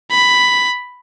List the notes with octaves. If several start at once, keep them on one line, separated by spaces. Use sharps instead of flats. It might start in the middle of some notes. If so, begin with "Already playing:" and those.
B5